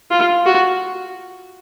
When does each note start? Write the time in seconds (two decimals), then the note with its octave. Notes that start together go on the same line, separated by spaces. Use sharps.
0.11 F4
0.46 F#4